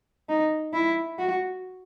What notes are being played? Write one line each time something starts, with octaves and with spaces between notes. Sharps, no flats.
D#4
E4
F#4